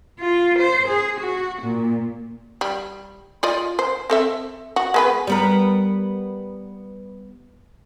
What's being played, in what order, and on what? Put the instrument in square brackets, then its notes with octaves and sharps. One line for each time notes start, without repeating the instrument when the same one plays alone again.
[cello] F4
C5
G#4
F#4
A#2
[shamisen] G3
F4 D5 D#5
C5
C4 A4 E5
F#4
G#3 B3 B4
[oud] G3 B3 A#4